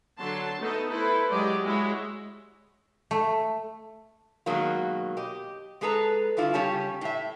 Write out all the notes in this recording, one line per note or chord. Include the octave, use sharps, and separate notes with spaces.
D3 F#3 F#4 A5 C6
A3 B3 D#4 A4 B4 D#5
E4 A4 B4 C5
F#3 G#3 G4 D5 D#5
G#3 E4 F#4 C#5
A3
B2 D#3 F#3 G#3 A#3
G4 D#5
G#3 G#4 A4 B4 A#5
G2 D3 E4 F4
C#3 G3 C#4 G4 C#5 A5
A2 E5